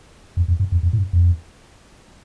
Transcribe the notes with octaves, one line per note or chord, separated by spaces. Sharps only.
F2
F2
G2
F2
F2
A2
G2
F2